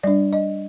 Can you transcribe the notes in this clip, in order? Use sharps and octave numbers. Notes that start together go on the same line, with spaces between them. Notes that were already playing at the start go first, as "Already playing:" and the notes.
G3 D4 D5
D#5